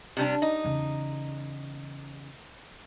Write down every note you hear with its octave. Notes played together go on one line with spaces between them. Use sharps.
C3 G3 D4
D#4
E2 C#3